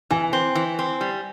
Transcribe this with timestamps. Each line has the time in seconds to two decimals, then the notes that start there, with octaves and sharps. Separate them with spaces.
0.10 E3 G#5
0.33 C4
0.55 E3
0.79 C4
1.01 G3